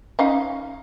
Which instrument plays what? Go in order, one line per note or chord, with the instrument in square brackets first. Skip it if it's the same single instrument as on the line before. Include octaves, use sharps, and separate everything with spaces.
[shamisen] C#4 D#4 F5